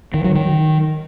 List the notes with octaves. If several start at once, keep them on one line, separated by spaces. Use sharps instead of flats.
D#3
F#3
D#3